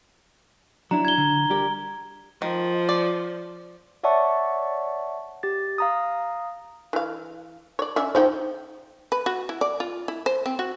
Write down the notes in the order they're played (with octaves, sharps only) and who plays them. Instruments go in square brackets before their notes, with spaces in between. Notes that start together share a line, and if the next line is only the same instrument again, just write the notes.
[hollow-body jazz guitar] F#3 D4 E4 [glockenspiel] A#5
[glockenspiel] G#6 G7
[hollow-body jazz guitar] D3
G3 G4 A#4
[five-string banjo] D#3 [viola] F3
[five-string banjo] D5
[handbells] C#5 D5 E5 F#5 A5 C#6
G4 A6
F5 A#5 D#6
[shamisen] E3 F5
C#5 D5
C#4 D5 E5
[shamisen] F3 D#4 G5 [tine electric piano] C5
[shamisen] B4
F#4
E4
D5
F4
E4
C5
C4
F#4